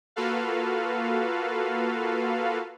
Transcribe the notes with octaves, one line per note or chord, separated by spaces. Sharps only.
A#3 F4 F#4 A4 B4 F5